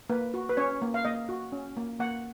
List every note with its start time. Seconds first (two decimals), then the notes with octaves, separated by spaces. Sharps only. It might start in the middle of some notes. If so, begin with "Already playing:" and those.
0.10 A#3 B4
0.34 F#4
0.49 B4
0.57 C#4 C#5
0.82 A#3
0.94 F5
1.05 A#3 D#5
1.29 F#4
1.52 C#4
1.77 A#3
2.00 A#3 F#5